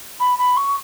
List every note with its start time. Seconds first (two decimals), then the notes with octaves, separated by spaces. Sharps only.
0.20 B5
0.38 B5
0.57 C#6